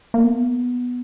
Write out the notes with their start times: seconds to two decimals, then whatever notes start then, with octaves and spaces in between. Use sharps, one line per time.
0.14 A#3
0.24 B3